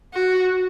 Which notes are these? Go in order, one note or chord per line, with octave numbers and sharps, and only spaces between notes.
F#4